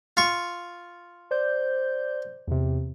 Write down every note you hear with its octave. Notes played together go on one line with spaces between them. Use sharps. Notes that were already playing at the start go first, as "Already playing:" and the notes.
F4 C#6
C5 D5 G6
E2 C3